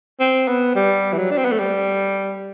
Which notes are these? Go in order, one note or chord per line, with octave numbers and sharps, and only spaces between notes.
C4
B3
G3
E3
F#3
D4
C4
B3
A3
G3